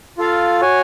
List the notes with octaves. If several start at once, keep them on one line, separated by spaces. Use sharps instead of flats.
F4 A4 F5
F#4 C#5 G#5